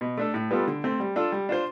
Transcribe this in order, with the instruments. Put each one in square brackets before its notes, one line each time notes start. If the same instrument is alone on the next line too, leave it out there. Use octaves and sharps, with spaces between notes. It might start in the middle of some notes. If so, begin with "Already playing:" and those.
[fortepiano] B2
A3 D4 A4
A2
G3 B3 F4 A4
D3
A3 C4
G3
D4 F4 A4
G3
D4 F4 C5